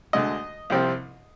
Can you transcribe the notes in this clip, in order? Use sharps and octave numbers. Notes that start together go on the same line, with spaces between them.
D2 D3 G#3 D#5
C2 C3 F3 C4